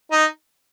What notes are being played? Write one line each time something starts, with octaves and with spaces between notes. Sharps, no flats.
D#4